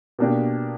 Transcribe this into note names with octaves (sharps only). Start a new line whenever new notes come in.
B2 A#3 D4 G4